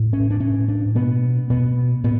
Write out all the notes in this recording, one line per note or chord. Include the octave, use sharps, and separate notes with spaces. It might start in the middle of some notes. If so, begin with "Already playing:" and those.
Already playing: A2
C#4
D4
A2 C#4
D4
B2 B3
B2 B3
A2 B3